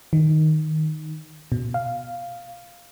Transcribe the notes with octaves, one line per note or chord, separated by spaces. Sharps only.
D#3
B2
F5